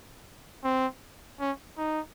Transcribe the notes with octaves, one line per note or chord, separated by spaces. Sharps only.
C4
C#4
D#4